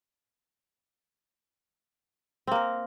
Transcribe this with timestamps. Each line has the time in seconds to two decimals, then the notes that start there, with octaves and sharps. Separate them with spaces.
2.47 C4
2.51 A#3
2.55 A#4